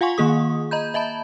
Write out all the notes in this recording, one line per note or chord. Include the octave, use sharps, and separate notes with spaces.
F4 F5 F#5 G#5 C6 C#6
D#3 A#3 G#4 D#6
D#5 A#5 B5 G6
D#5 E5 A5 B5